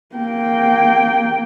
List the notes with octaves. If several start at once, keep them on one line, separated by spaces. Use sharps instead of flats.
A#3 G5